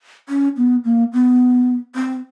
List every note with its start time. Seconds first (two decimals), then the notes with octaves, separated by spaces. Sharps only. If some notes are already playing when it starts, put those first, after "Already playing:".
0.29 C#4
0.57 B3
0.85 A#3
1.13 B3
1.96 C4